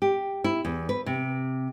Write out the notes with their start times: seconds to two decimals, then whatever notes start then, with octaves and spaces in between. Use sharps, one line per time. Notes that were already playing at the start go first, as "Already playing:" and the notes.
0.02 G4
0.44 E4
0.65 E2
0.89 B4
1.06 C3